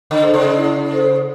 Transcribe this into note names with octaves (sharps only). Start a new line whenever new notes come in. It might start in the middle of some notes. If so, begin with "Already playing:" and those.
D3
A4 C5
C#3
E4
A4 C5